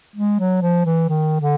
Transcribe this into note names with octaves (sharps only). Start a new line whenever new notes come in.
G#3
F#3
F3
E3
D#3
D3